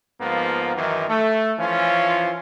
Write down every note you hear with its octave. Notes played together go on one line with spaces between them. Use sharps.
G#2 F3 A#3 B3
F#2 D#3 E3
A3
E3 F3 C#4 F4